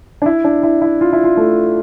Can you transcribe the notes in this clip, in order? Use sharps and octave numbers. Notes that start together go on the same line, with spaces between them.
D4
E4
D4
E4
E4
F4
E4
F4
A3